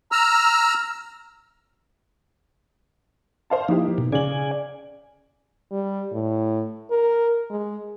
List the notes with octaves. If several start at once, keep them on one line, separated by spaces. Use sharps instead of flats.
A#5 E6 F6
C5 F5 A5
F3 A#3 D#4 E4 G4
B2
C#3 G#4 D5 G#5 F#7
G3
A2
A#4
G#3